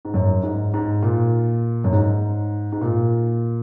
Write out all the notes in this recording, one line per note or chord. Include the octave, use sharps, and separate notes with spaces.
G#2
F#2
G#2
G#2
A#2
F#2
G#2
G#2
A#2